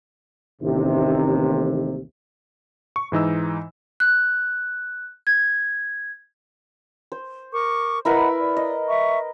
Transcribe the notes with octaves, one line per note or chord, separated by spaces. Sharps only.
A1 D#2 C3
C#6
G#2 E3 D#4 E6
F#6
G#6
C5
A#4 C#6 D6
E4 A#4 B4 D#5 F#5
D5
D#5
E5 C#6